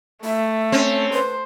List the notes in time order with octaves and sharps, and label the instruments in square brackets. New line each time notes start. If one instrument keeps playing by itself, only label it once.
[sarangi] A3 [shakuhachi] E5
[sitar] C4 C#4
[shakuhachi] B4 [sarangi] C5